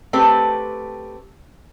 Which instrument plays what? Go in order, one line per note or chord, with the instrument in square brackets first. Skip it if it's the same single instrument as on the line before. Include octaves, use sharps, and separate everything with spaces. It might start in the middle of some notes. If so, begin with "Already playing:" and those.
[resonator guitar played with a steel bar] A3 C4 G4 B4